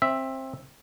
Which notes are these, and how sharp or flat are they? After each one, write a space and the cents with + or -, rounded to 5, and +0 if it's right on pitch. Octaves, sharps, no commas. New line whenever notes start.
C4 +20 E5 +0